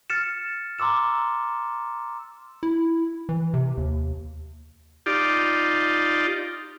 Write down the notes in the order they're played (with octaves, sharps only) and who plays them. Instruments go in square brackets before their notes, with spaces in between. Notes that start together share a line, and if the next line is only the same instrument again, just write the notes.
[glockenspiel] F6 A6 C#7 E7
A#5 C6 D6 E6 E7
[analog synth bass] E4
E3
C3
D#2
[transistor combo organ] D#4 F4 G4 D5